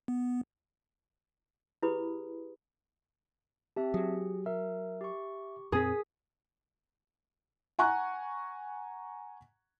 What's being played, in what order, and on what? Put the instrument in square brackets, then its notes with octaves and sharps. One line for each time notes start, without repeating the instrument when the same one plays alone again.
[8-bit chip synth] B3
[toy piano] E4 G4 G#4 B4 B5 D#6
[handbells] C4 E5 A5 [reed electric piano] G4
[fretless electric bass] F#3 [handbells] G#4
[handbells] A#4 [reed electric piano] E5
[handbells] G4 C#6
[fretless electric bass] F2 A#2 C4 [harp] G#4 [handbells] D#6 B6
[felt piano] F#5 G#5 A#5 C#6 F#6